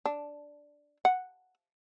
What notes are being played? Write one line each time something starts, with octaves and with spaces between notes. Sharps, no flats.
D4
F#5